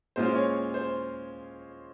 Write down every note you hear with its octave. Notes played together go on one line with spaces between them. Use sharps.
A#2 G#3 C#4 F4 C5
C#5
C5